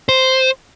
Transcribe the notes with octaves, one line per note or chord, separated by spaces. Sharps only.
C5